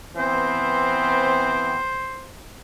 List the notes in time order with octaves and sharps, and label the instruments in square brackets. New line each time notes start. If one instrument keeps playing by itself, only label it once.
[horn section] E3 B3 C4 [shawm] C5